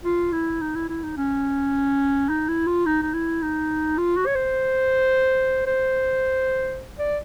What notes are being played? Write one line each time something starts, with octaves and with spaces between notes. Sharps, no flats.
F4
E4
D#4
E4
E4
D#4
C#4
D#4
E4
F4
D#4
D#4
E4
D#4
F4
F#4
C#5
C5
C5
D5